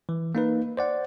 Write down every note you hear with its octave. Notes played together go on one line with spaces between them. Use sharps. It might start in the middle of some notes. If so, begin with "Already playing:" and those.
E3
A#3 D#4 B4
C5 D5 F#5